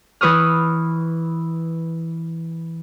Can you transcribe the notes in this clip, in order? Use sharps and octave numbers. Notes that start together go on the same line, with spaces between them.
E3 B4 C#6 D#6 F6